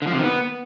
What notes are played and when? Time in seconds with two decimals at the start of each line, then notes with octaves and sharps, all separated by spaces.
0.02 D3
0.07 F3
0.13 C3
0.18 D#3
0.24 B3